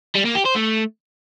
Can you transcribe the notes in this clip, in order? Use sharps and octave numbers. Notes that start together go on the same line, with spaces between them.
G3
A#3
G4
C5
A3